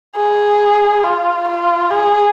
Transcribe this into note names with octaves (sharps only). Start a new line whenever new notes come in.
G#4
F4
F4
G#4